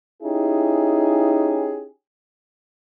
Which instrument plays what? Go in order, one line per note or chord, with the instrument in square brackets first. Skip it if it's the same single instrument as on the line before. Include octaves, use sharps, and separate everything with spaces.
[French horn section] C#4 D#4 E4 G4 G#4